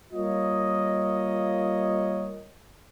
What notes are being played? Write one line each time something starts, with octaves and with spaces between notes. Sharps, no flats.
G3 A#3 F4 A#4 C#5 D#5